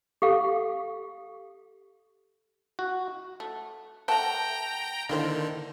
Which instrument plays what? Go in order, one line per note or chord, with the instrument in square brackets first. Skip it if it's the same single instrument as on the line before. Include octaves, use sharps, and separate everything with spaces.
[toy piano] G4 A4 F5
[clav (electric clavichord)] F#4
[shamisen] A3
[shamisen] A3 F#5 A5 [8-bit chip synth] G5 A#5
[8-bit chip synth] D3 D#3 [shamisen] A#3 E4 C5